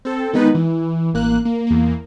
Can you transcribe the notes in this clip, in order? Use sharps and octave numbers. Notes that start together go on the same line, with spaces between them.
C4 A4
D#3 G#3 B3 D#4 B4
E3
A1 A#3 F#6
A#3
E2 A#3